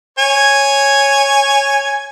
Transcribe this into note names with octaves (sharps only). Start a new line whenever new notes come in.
C#5 G#5